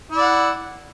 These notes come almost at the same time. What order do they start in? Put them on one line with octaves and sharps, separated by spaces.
E4 D5 F#5